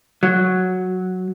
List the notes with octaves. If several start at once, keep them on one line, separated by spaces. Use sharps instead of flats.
F#3